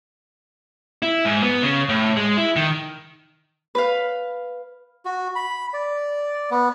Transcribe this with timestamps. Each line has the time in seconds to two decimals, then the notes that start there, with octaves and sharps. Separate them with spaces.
1.02 E4
1.25 G#2
1.43 B3
1.62 C#3
1.89 A2
2.17 G#3
2.37 E4
2.56 D#3
3.75 B4 F5
5.05 F#4
5.35 B5
5.73 D5
6.51 B3